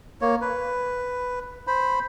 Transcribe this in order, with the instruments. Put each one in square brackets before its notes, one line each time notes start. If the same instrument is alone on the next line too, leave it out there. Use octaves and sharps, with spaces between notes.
[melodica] A#3 C#5
B4
C5 B5